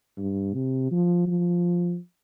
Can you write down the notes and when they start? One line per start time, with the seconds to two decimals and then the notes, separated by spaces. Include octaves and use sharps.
0.18 G2
0.54 C3
0.92 F3
1.27 F3